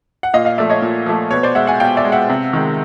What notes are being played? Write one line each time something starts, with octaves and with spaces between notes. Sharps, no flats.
F#5
A#2 D#5 F5
D#5 F5
F3 A3 D5 E5
C#5 D#5
A#2
F3 A3
B2 B4 C#5
C5 D5
G#3 E5 F#5
F#5 G#5
B2 F5 G5
D5 E5
G#3
E5 F#5
C3
D#3 G#3